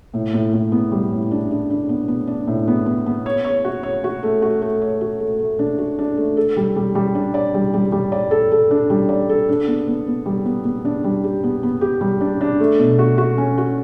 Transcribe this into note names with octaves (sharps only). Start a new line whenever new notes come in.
A2
A2
A2
B3
G3
A2
D4
D4
D4
B3
B3
D4
A2
B3
B3
B3
C#5
C#5
F#4
C#5
F#4
A3
F#4
A3
C#5
F#4
A3
A3
D4
F#4
D4
A3
A4
G3
G3
G3
D4
D5
G3
G3
G3
D5
A4
A4
D4
G3
D5
A4
D4
B3
B3
B3
G3
B3
B3
D4
G3
G4
B3
B3
G4
G3
D4
D4
A3
B2
F#4
F#4
C#4
F#4